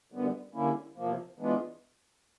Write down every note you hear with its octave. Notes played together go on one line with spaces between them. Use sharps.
F#2 D3 G3 B3
D3 G3 A#3 C#4 E4
E2 C3 F3 A#3
E3 G#3 B3 D4 F4